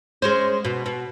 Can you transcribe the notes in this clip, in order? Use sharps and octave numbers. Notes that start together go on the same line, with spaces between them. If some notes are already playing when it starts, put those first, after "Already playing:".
G#3 C#4 C5
B2
B2